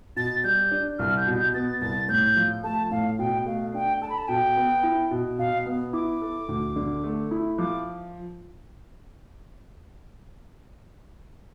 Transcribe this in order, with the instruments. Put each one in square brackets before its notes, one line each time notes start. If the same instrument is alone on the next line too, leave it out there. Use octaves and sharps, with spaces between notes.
[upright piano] B2 [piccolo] A6
[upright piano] G3 [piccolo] G6
[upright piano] D4
[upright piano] C2 [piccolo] F6
[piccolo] G6
[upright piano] B2
[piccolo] G6
[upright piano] B3 [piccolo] A6
[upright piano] C2 [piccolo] A6
[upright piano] A2 [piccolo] G6
[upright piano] F3
[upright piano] A3 [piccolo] A5
[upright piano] A2 [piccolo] F5
[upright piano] B2 [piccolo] G5
[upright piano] A3 [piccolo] F5
[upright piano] D4 [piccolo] G5
[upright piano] A4 [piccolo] A5
[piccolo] B5
A5
[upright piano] B2 [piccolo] G5
[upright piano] B3
E4
B2
[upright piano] B2 [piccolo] F5
[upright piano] B3
[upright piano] E4 [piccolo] D6
[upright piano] A4
D2
D3
A3
E4
[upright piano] F3 [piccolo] D6